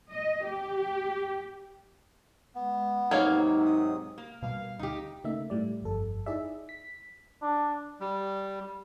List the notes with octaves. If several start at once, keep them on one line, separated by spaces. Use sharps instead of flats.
D#5
G4
G#3 B3
G#2 C3 F#3 A#3 D#4 C#5 F5
D#6
A#3
B2 G3 F5
D2 D#4 G4
C#3 A3 A#3 D#4 E5
A2 G3 D5
G1 F2 A4
D#4 E4 G#4 D5 E5
B6
D4
G3